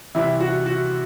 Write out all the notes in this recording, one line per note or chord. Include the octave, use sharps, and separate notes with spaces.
C2 C3 E3 E4
F#4
F#4